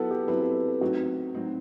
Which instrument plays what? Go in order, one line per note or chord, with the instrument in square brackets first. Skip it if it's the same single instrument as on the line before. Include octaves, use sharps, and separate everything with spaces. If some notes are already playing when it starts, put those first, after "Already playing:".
Already playing: [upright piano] F#3 B3 E4 [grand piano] A4 B4
[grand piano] G4
[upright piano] F#3 C4 E4 [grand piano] B4
[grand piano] A4
B4
A4
[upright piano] A2 F#3 C4 D#4 [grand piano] F#4
[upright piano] A2 F#3 C4 D#4